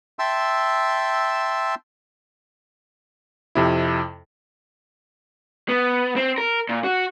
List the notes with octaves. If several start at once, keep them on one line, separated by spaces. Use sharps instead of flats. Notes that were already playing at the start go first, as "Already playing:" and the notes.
E5 G5 A5 C6 E6
F2 C3 E4
B3
C4
A#4
A#2
F#4